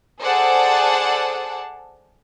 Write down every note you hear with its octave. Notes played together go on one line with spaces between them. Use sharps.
G#4 A4 C5 D5 F#5 A5